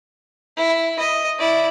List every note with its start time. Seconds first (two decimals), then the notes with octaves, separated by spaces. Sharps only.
0.57 E4
0.99 D#5
1.39 E4 D5